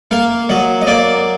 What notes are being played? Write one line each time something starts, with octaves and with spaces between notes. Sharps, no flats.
A#3 F5
F#3 D#5
D#5
A#3 D5